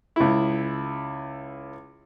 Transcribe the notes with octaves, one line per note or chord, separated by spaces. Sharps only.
C#2 E4